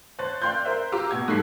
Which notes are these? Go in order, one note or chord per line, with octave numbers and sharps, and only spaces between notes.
C5 C#5 F#6 A6
D5 F5 G5 C6 F#6 G6
A#4 C5 E5
F4 G4 A#5 D6 E6
B2 F#4 G#6
G#2 G3 A4 F#6 B6 C7